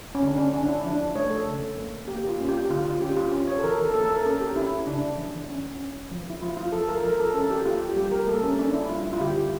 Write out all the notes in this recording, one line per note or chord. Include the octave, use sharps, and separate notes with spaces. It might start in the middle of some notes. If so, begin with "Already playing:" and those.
C#4
D3 D4
C#4
C#4 D4
E4
F3 D4
A3 C#5
A4
C#3
A#3
A#3 G4
F4
C#4
F4
G4
D3 F4
F4
C#4 G4
F4
C#4
C#5
A4
E3 A#4
A4
A#3 A4
A#4
C#4 A4
G4
C#4 E4
C#3 D4
E3
C#4
C#4
F3
E4
F3 F4
F4
F3 A4
A#4
F3 A#4
A4
C#4 A4
G4
A#3 F4
G4
G3 G4
A#4
A#3 A4
C#4
C#4 D4
E4
G3 F4
E4
F4
D3 G4